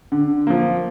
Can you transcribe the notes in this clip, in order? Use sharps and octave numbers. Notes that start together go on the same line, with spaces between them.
D3
F3 A#3